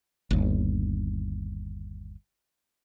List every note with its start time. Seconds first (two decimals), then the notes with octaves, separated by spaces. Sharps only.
0.31 G1 D#2